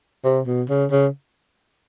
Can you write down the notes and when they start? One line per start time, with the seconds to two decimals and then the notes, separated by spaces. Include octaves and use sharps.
0.25 C3
0.47 B2
0.69 C#3
0.91 C#3